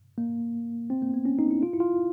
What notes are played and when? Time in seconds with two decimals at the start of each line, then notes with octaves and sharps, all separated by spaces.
0.18 A#3
0.90 C4
1.02 A#3
1.14 B3
1.25 C#4
1.39 D#4
1.51 E4
1.63 F4
1.73 E4
1.80 F4